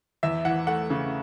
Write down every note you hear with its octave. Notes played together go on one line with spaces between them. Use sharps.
E2 E5
E3 F#5
A3 F#5
C#3